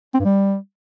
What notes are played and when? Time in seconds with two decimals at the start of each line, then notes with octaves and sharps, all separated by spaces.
0.14 C4
0.19 G2
0.25 G3